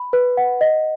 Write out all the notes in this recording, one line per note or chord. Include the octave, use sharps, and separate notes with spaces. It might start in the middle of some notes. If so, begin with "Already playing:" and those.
Already playing: B5
B4
F#5
D#5